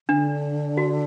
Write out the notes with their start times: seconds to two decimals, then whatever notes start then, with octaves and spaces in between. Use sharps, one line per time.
0.08 D3 D4
0.77 F#4